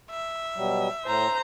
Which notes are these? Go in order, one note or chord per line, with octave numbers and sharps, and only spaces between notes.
E5
B2 F#3 G3
A2 C5 A#5